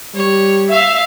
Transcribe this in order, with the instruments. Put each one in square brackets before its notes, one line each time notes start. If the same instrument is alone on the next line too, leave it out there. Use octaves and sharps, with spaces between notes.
[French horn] G3 [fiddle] C#5
[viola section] E5 [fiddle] F5